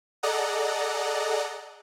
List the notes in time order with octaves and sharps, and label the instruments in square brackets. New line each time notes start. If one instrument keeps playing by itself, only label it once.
[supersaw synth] G#4 A4 D5 D#5 F#5 A#5